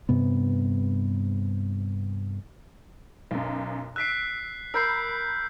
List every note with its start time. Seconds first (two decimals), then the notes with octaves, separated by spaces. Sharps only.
0.09 G2 C3 B3
3.31 B1 F#2
3.96 E6 F#6 B6 C7 D7
4.74 A#4 B5 E6 G6 C7